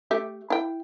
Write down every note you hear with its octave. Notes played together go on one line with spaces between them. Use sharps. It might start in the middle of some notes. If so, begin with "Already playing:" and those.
A3 G4 E5
E4 G5